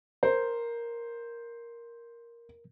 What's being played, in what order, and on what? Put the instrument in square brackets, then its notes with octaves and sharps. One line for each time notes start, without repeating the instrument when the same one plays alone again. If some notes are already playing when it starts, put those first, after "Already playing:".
[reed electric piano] A#4 [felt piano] C5